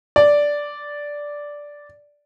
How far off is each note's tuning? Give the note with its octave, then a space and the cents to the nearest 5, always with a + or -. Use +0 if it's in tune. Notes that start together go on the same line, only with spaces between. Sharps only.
D5 -5